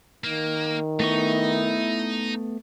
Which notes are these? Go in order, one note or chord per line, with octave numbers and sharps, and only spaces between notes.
D#3 A#3
A3 B3 D#4 E4 C#6